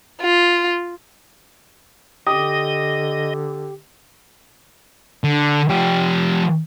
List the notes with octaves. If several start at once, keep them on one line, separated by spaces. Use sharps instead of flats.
F4
D3 G4 D#5 D#6
D3
F3 G4